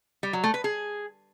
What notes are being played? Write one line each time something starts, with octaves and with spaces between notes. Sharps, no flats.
G3
F#3
A3
B4
G#4